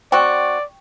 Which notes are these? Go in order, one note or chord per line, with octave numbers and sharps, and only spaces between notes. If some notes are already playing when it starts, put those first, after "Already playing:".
C4 F#4 D5 G5 C#6